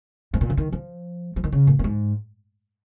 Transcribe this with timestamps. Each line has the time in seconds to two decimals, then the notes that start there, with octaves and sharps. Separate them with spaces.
0.34 G#2
0.41 A#2
0.50 C#3
0.57 D#3
0.72 F3
1.36 F3
1.44 D#3
1.52 C#3
1.67 A#2
1.79 A#2
1.84 G#2